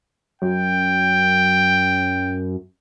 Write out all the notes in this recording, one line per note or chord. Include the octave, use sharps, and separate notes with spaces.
F#2 G5